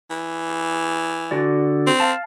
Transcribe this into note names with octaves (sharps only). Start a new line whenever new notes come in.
E3
D3 F#4 D5
C4
F5 A5